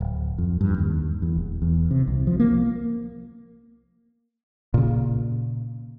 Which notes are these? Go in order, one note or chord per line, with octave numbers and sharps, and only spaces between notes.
D1
F2
G2
D#2
E2
D#1
E2
C3
C2
F3
A#3
A#2 C#3